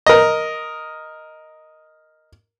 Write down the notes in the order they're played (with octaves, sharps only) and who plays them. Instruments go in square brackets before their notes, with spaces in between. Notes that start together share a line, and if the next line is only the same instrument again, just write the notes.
[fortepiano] A#4 D#5